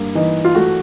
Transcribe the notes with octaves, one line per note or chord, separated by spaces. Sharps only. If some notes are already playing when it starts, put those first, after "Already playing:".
Already playing: G2 A#3
E3 D#4
F4
A3 F#4